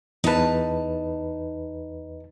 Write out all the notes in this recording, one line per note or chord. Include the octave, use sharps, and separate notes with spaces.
E2 D#4 B4 A5